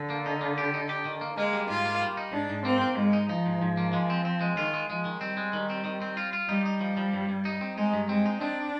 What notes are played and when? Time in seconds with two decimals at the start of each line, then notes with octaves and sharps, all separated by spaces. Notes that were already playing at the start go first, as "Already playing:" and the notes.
Already playing: D3
0.10 A#3
0.26 D#4
0.41 A#3
0.58 G4
0.74 D#4
0.89 G4
1.05 D#3
1.21 A#3
1.37 G#3 A#3
1.53 G3
1.69 G#2 F4
1.85 A#3
2.01 G3
2.17 D#4
2.33 G#2 D4
2.50 G#2
2.65 A#3 C4
2.81 A#3
2.97 G#2 G#3
3.13 D#4
3.29 F3 D#4
3.46 G#2
3.62 G#2
3.77 A#3
3.93 G#3
4.10 C4
4.25 C4
4.41 G#3
4.57 D#3 F4
4.74 G#3
4.89 F3 G#3
5.05 D#3
5.21 G3 C4
5.37 G#3
5.53 D#3
5.70 C4
5.85 D#3
6.02 C4
6.17 F4
6.33 F4
6.49 G3 D#4
6.66 D#4
6.81 F3
6.97 F3
7.13 G2
7.29 G2
7.45 D#4
7.61 C4
7.77 G#3 D#4
7.93 G2
8.09 G#3 C4
8.26 D#4
8.41 C4 D4